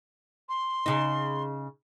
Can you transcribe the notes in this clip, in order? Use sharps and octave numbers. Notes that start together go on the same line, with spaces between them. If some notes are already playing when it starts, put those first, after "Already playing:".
C6
C#3 D#4